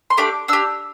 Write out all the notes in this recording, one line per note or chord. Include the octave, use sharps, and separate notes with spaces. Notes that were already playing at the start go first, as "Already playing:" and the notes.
C6
A3 D4 G4 D6
D4 G4 E6